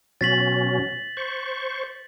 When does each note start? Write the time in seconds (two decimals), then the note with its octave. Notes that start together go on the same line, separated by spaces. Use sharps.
0.21 B2 F#3 C#4 A6 B6 F#7
1.17 C5 C#6